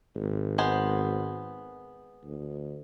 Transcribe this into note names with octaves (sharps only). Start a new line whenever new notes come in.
G#1
G#3 B3 C5
D2